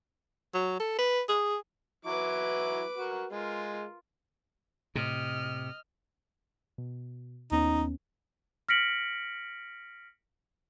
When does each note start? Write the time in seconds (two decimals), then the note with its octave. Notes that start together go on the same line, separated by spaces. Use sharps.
0.54 F#3
0.80 A4
0.98 B4
1.29 G#4
2.05 E3 F#3 E4 B4 D6
2.98 F#4 A#4
3.31 G#3 F4 A#4
4.96 A2 C3 D#5 F6
6.78 B2
7.52 D#2 B3 C#4 D#4
8.69 F6 A#6 B6 C#7 D7 F#7